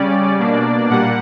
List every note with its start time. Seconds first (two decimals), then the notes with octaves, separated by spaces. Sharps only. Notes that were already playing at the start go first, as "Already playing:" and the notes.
Already playing: C#3 G3 C#4 D5
0.39 B2 A#3 D4
0.90 A#2 G3 A#3 F#5